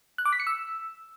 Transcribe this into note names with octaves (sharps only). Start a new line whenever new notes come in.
F#6
D6
B6
C#7
E6